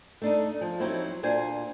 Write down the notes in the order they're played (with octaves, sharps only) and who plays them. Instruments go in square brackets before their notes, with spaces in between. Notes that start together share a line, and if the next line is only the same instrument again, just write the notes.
[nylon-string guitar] A3 D4 D#4
F3
F#3 C4 D#4 E4 C5
A#2 D4 C5 G#5